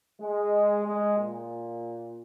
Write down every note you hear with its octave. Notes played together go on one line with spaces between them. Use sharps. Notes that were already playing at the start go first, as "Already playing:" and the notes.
G#3
G#3
A#2